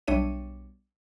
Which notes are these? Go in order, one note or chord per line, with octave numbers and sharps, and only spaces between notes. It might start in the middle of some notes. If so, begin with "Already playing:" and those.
B1 G3 D4 C#5 E5 D#7